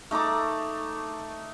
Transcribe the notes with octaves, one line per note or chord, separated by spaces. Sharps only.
A3 D#4 A#5 D6